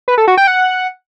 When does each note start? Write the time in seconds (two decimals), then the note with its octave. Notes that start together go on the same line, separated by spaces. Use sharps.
0.08 B4
0.18 A4
0.28 F#4
0.37 G5
0.47 F#5